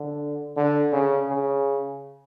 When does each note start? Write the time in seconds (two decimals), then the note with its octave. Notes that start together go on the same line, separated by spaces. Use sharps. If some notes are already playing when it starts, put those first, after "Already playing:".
Already playing: D3
0.56 D3
0.93 C#3
1.29 C#3